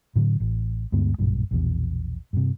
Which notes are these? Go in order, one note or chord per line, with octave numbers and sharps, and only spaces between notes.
A2 D3 F#3
A1
D2 G2 G#3 B3
F#1 B1 G2 A#2
A#1 E2 B2
G2 C3